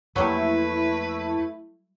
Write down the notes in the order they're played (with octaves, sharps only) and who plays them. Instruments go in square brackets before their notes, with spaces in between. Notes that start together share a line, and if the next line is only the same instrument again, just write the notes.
[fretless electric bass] F2 A#3 [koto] F#3 G3 [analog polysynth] A3 E4 [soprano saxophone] B4